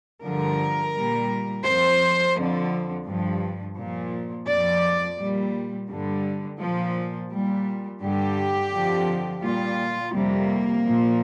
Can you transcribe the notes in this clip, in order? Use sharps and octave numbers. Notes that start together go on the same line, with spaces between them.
G2 D3 F3 A#4
A#2 G3
F2 F3 C5
F2 D3 F3
G2 F3
A#2 F3
F2 F3 D5
A#2 G3
G2 D3 G3
A#2 F3
A#2 G3
G2 D3 G3 G4
F2 D3 F3
A#2 G3 F4
F2 C3 G3 A#3
A#2 F3